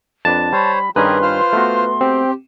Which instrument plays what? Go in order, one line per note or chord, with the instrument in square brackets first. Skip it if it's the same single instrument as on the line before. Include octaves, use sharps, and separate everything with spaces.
[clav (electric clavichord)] F2 D4 B4 [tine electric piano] A5 A6
[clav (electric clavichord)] G3 [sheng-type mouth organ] C5 C#5 [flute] B5
[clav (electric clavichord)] G2 D#3 C#4 [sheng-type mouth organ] G4 G#4 A#4 [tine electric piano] B4 [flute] C6
[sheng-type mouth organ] F4 C5 F6
[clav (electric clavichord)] A3 B3 F#4
[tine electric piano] C4 [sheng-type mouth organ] G4